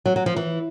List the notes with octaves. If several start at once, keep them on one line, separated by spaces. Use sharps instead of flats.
F#3
F#3
F3
E3